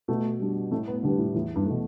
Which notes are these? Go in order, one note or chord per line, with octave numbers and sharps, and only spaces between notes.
B2 A3
G3 D4
A2 A3
B3
D3 G3 D4 G4 B4
A2
E2 A2
G2
B2 E3 A3